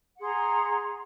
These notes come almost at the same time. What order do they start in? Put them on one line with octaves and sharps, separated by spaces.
F#5 G#4 C6 A#5